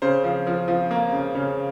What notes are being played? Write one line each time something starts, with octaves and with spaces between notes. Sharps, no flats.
C#3 C5
F3
F3
F3
A#3
C#3
C#3